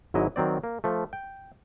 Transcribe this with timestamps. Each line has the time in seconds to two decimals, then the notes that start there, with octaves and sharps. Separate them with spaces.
0.14 G#1 G#2 F#3 E4 D#5
0.36 D#3 F#3 C4 D5
0.64 A#3
0.84 F3 A3
1.13 G5